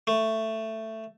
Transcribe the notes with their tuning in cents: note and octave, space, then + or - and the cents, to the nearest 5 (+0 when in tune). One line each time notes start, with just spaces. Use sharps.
A3 +10